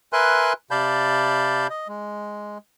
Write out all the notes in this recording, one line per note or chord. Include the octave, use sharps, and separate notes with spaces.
A#4 B4 E5 G#5 C6 F#6
C3 D5 F5 A5 B5 G6
D#5
G#3